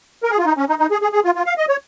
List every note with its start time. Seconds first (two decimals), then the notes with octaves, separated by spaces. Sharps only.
0.23 A#4
0.31 G#4
0.38 F4
0.45 D#4
0.57 C#4
0.69 D#4
0.79 D#4
0.91 G#4
1.02 G#4
1.12 G#4
1.24 F4
1.35 F4
1.46 F5
1.58 D#5
1.69 C#5